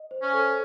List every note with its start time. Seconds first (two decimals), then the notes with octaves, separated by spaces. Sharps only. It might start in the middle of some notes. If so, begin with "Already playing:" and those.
Already playing: D#5
0.11 C5
0.22 C#4
0.33 A4